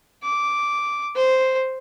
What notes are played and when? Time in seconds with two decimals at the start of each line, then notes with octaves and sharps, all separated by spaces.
0.24 D6
1.16 C5